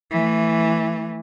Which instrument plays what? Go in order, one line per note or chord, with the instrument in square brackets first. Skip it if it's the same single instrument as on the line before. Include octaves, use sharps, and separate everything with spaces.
[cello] E3 A3